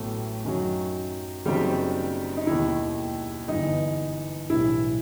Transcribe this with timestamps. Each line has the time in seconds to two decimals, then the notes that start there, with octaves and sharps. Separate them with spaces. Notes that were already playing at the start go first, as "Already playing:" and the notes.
Already playing: A1 A2 F#3 A3 B3
0.44 F#2 D#3 F#3
1.45 F#1 F#2 D#3 F#3 G3 C4 G4
2.37 D#4
2.47 E1 D#2 D#3 E4
3.48 G1 G2 E3 D#4
4.50 B1 A2 E3 G3 E4